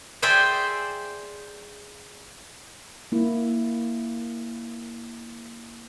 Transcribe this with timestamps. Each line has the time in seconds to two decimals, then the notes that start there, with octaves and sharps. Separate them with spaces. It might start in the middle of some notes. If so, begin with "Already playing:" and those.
0.22 G#4 C5 D5 E5 G5 G#5
3.12 A#3 E4